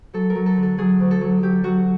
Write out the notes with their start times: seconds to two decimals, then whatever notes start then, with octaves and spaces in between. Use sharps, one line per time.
0.13 F#3 A4
0.30 A#4
0.35 F#3
0.46 A4
0.57 D3
0.63 A4
0.78 F#3 G#4
1.00 D2
1.11 A4
1.21 F#3
1.42 F#3 G4
1.63 F#3 F#4